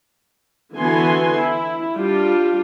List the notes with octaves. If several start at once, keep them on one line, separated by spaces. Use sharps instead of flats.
D3 E3 B3 F#4 G#5 C6
E4
G3 D4 F4 G4